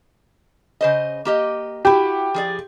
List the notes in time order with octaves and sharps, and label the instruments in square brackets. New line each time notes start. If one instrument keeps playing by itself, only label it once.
[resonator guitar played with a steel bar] C#3 C5 D#5
A#3 G4 D#5
[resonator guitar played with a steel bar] E4 F#4 [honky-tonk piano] G4
[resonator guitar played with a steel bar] F3 G#4 D5